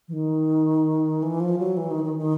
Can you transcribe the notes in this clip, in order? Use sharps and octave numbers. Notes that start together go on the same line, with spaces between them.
E3
D#3
E3
F3
F#3
E3
D#3
D#3
D#3